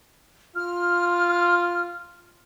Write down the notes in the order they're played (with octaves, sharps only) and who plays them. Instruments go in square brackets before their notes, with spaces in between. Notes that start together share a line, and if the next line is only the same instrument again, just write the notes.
[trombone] F4 [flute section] F6